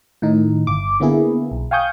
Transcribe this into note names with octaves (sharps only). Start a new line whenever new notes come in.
A2 D#3 D#4
G1 D6
D3 A#3 B3 E4 G#4
B1
F5 G5 G#5 C#6 D#6 G6